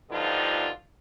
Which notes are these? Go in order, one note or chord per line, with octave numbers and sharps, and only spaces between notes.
B2 D3 F3 G3 D#4 F4